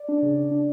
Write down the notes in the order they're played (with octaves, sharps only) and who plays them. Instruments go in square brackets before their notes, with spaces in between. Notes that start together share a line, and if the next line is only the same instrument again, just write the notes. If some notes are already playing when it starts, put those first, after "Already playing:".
Already playing: [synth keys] D5
D4
C#3
C#3
D4